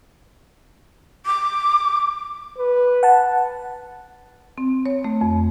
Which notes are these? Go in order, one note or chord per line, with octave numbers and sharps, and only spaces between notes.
D6
B4
F#5 A5
C4
C#5
A3
F2